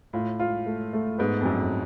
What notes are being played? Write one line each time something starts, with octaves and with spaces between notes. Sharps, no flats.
A2 F4
F4
A3
A3
G#2 B3
F2
F#2 F#3